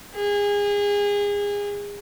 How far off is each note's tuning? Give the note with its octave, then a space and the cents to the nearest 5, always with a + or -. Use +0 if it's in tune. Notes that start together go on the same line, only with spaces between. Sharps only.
G#4 -30